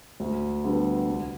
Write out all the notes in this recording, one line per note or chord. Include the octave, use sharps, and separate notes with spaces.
D2
D3 G3 B3
C2